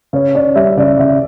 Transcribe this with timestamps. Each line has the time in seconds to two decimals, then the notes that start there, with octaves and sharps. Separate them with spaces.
0.13 C#3 C#5
0.35 C#4 D5
0.56 G3 E5
0.77 C#3 D5
0.99 C#3 E5